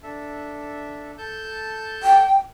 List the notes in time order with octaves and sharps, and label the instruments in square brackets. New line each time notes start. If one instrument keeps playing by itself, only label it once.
[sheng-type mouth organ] D4 A4 E5
A4 A5 G6
[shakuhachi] G5